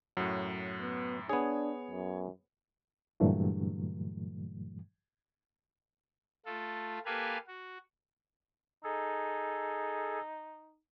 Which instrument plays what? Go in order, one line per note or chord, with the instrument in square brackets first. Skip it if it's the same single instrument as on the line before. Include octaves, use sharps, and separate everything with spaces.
[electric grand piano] F#2 A2 [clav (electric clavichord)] F#3
[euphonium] B3
[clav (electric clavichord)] B3 G#4 [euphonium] D4 [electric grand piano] C#5
[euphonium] F#2
[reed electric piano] G2 A#2 D3 E3 F#3 A3
[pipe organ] A3 F4 A4
A#3 G4 A4 B4 F5 G#5
F#4
[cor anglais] D#4 [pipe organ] G#4 A4